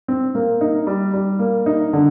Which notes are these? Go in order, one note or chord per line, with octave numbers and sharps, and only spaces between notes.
C4
A#3
D#4
G3
G3
A#3
D#4
D3